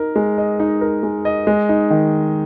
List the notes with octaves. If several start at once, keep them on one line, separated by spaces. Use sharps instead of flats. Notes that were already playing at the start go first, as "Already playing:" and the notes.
Already playing: D#4 A#4
G#3
D#5
D#4
A#4
G#3
D#5
G#3
D#4
D#3